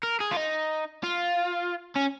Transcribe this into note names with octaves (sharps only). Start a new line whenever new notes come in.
A#4
G#4
F4
D#4
F4
C#4